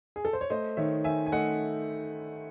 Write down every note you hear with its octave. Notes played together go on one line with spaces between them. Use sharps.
G#4
A4
C5
C#5
A3 C5 D#5
D#3 C#5 E5
D#3 E5 G#5
G#5
A3 D#5 F#5